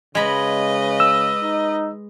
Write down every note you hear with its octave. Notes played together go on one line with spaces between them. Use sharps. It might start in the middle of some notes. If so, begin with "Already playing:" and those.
C#3 G#3 B4 D#5 B5
E6
D#4